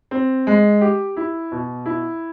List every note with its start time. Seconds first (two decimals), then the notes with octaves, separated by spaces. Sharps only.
0.11 C4
0.47 G#3
0.81 G4
1.17 E4
1.52 B2
1.86 E4